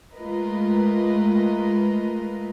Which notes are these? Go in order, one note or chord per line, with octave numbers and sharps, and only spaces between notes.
G#3 A3 F4 A#4 B4 D#5